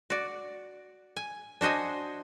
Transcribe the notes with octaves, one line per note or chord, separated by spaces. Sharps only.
F#4 D5
G#5
D4 F#4 C5 D#5 G#5